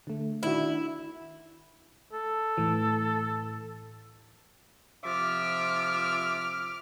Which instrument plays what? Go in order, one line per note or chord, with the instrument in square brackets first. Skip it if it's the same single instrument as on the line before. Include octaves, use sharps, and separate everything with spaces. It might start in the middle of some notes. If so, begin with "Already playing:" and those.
[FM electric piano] D3 A3
[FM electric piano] D#3 D4 F#4 [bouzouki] E4
[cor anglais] A4
[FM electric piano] A2 E3
[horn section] C3 F3 E5 [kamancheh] D6 F6